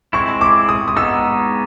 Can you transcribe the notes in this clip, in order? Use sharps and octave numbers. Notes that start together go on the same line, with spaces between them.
G#3 C4 E4 C#6
D6
D#6
D#6
G#3 B3 D#4 E6